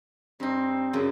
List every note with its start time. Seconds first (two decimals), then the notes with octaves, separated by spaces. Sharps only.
0.40 G2 C4 D#4
0.93 F#2 C#3